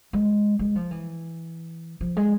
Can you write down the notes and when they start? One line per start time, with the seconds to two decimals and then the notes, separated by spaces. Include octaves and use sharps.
0.13 G#3
0.59 G#3
0.75 F3
0.91 E3
2.01 F3
2.17 G#3